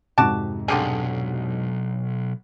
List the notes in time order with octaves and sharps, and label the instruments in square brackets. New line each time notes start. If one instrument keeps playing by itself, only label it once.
[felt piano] F2 G#2 C3 [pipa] F#4 D5 A5
[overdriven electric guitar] B1 [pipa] D3 G4 G#4